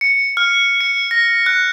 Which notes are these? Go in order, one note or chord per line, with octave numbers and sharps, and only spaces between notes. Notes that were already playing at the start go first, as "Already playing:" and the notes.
C#7
F6
C#7
A#6
F#6